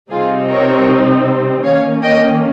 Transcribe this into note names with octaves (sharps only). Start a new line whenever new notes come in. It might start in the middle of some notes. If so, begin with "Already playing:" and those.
C3 G3 C4 D#4 F4 G#4
A#4 C#5
D#3 A#3 C#4 C#5 F5
D#5 G5